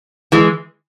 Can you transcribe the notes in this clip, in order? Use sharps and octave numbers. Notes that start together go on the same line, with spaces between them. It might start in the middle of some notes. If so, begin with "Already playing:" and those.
E3 G#3